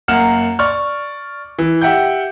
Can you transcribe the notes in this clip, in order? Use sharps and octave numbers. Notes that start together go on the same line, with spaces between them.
F#2 A#3 F#5 F6 E7
D5 C#6 F6
E3
G4 E5 F#5 G5 G6